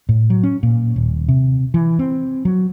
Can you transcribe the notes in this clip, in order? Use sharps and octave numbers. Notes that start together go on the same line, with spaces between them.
A2
F#3
C#4
A#2
D#1
C3
E3
C4
F#3